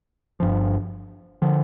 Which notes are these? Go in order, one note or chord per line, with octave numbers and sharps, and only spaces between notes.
G1 G2 F3
D3 F3